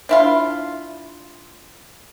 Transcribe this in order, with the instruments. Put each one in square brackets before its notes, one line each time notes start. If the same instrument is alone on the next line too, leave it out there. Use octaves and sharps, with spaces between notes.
[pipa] D4 E4 F4